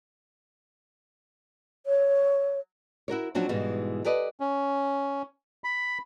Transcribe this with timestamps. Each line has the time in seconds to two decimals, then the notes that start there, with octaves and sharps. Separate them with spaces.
1.86 C#5
3.08 E4 F#4 A#4 C#5
3.35 F3 F#3 C4 D4 F#4
3.49 G#2 B2 E3 G3 G#3
4.05 G4 A4 B4 D5 D#5
4.40 C#4
5.64 B5